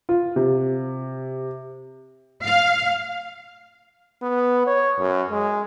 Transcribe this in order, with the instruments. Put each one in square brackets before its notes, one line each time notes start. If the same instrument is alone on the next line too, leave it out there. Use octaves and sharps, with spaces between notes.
[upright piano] F4
C3
[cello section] F5
[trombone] B3
C#5
F#2
G#3